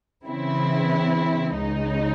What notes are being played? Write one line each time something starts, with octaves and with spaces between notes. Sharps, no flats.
C#3 E3 C4 E4
C#2 C#3 G#3 D#4